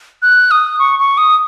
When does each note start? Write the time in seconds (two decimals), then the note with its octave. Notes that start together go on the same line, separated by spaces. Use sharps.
0.22 F#6
0.51 D#6
0.79 C#6
0.99 C#6
1.18 D#6